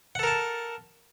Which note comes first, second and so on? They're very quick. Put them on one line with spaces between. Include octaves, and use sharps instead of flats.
F#5 A4 A#4 A5